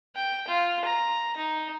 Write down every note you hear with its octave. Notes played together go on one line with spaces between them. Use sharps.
G5
F4
A#5
D#4